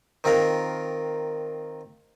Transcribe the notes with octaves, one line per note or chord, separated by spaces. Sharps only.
D#3 C4 F4 A#4